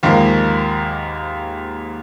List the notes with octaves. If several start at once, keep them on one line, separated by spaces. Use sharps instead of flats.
D#2 G#2 F3 A#3